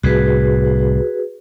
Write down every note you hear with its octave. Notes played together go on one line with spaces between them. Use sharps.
C2 A2 F#4 G#4 B4